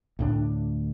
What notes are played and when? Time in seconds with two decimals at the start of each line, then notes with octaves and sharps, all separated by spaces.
0.19 D2 A2 D4